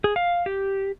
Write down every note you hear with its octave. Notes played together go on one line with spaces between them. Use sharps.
G#4
F5
G4